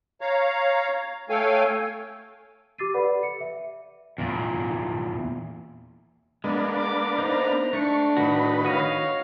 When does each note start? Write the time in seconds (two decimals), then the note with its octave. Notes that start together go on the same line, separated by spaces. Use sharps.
0.21 C#5 F5 A#5
1.30 A3 A4 C#5 F5 G5 G#5
2.78 G4 D6 E6 A6 C7 D#7
2.94 A4 B4 D5 F#5 B5
3.23 C#7
3.41 E5
4.18 E2 A#2
6.44 G#3 A#3 B3 D4
6.76 D6
7.18 D#4 C5 A#5
7.73 A3 D4 C#6
8.17 A2 D#3 F#4 B4
8.64 F#4 C#5 D#5 F5